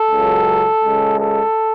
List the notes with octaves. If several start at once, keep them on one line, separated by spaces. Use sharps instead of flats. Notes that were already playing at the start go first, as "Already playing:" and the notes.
Already playing: A4
C#2 C#3 F#3
C#2 C#3 G#3
A4